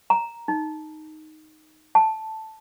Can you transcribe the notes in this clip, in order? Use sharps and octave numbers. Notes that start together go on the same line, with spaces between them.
A#5
D#4
A5